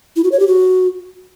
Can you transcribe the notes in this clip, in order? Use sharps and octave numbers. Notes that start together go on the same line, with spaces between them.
E4
F#4
C#5
G4
F#4